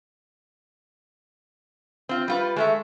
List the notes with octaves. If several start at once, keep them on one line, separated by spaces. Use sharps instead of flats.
C4 F4
G3 F4 B4
G#3 A3 E5